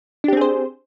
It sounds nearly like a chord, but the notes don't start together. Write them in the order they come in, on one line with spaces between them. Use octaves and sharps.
D4 G4 C4 G#4 C5